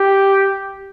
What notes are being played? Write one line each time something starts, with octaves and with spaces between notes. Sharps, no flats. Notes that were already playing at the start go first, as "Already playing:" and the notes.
Already playing: G4